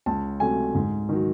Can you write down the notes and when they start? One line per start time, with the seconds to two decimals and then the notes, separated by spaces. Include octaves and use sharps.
0.06 C#2 A5
0.40 C3 F#3 A3 G#5
0.75 G#2
1.09 D#3 F#3